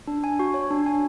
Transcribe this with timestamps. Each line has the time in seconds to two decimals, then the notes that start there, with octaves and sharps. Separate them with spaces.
0.07 D4
0.24 G#5
0.39 F#4
0.54 C#5
0.71 D4
0.86 G#5